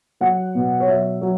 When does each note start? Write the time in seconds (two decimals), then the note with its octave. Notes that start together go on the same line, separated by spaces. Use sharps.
0.21 F#3 F#5
0.55 B2
0.80 C#5
0.87 F#3 E5
1.22 F#3